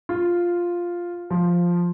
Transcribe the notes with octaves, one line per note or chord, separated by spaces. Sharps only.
F4
F3